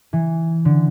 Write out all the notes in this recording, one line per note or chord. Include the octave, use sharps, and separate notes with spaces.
E3
D3